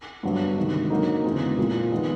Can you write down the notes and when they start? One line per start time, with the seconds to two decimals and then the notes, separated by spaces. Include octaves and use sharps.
0.23 G2 D3 F#3 B3
0.57 C3 D#3 G#3
0.90 D3 F#3 A#3 D#4
1.24 E2 C#3 E3 G#3 C4
1.58 A#2 F3 A#3
1.92 D#3 G#3 B3 D#4